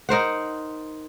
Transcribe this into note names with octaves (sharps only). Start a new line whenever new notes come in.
D#4 A#4 C5 F#5